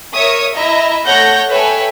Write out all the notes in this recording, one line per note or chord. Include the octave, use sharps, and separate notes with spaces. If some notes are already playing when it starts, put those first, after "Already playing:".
A#4 C#5 E5 C#6 D#6
E4 D#5 E5 A#5
A3 A4 C#5 F#5 G6 A#6
A4 B4 C#5 E5 G5 G#5